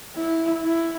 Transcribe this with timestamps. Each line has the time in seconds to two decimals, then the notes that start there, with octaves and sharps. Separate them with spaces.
0.16 E4
0.64 E4